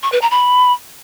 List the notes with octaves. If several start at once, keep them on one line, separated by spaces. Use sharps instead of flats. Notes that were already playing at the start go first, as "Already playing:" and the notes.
C#6
B4
A#5
B5